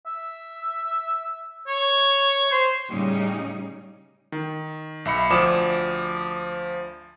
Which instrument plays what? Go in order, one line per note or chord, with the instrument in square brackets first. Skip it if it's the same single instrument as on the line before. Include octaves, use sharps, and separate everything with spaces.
[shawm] E5
C#5
C5
[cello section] A2 C#3 G3 C#4 D#4
[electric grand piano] D#3
B1 E5 B5 C#7
D2 F3 D5 D6 D#6 E7